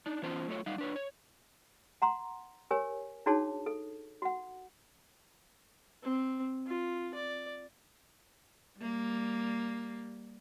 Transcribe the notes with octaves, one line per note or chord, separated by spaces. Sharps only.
D4 D#4
E3 B3 C#4 F4 C5 A5
F#3 A3 F4 A4 C#5
G3 D#4 F5 F#5
D4 B4 C#5
C#5
F#5 A#5 C6
G4 A#4 C#5 G#5
D4 D#4 F#4 G#4 C#5 A5
A4
F#4 F#5
C4
F4
D5
G3 A#3